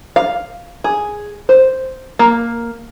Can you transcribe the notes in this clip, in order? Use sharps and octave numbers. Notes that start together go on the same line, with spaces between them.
F5
G#4
C5
A#3